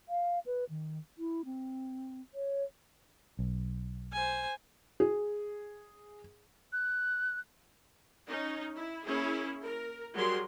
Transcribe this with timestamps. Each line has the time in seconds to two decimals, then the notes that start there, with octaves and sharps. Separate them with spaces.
0.09 F5
0.46 B4
0.70 D#3
1.18 E4
1.45 C4
2.34 C#5
3.39 B1
4.13 C5 G#5
5.00 G#4
6.73 F#6
8.29 C#4 D#4
8.76 E4
9.05 A#3 C#4 E4 G#4
9.63 A#4
10.14 F#3 G3 G4 G#4 A#4 C6